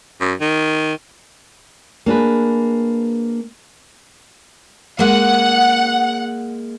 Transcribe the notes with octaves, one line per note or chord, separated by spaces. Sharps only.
F#2
D#3
A#3 D4 G#4 B4
G#3 A#3 F#5